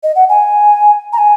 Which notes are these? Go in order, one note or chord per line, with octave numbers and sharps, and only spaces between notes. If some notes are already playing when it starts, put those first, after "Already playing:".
D#5
F#5
G#5
A#5
G#5